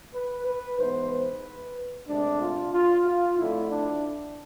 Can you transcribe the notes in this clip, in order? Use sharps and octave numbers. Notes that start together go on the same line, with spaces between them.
B4
B4
G#2 E3 B3 C5
B4
D2 C3 G#3 D4
F4
F4
F4
F2 D3 A3 E4
D4